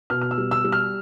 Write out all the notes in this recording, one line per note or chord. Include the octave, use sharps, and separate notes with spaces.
B2 F6
F6
E6
G3
E6
G3
F6